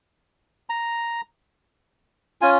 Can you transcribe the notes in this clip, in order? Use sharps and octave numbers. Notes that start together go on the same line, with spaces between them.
A#5
C#4 F4 G#5